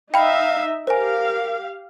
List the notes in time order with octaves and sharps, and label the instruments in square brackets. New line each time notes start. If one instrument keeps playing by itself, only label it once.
[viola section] D#4 E5 [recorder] F5 [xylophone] G5 B5
[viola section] G4 F5 [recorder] A#4 [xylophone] C5 G#5